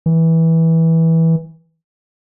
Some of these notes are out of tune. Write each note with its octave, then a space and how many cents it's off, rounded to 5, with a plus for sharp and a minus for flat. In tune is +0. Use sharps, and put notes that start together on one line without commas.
E3 -15